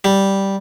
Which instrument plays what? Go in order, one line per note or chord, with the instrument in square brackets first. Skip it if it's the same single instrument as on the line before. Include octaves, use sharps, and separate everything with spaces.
[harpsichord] G3